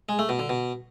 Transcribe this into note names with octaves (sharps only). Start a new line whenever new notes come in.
G#3
A3
B2
D3
B2